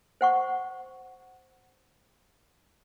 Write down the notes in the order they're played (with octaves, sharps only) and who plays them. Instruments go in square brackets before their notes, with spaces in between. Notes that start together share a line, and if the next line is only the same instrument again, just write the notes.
[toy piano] C5 F#5 C#6